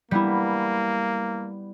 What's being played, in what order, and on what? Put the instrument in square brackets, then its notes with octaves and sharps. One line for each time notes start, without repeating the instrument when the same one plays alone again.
[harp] G3 B3 E4 [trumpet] A#3